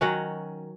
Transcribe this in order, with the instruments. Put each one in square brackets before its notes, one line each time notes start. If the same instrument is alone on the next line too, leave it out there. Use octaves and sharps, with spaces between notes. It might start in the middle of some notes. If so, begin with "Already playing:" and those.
[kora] D#3 F#3 C#4 F#5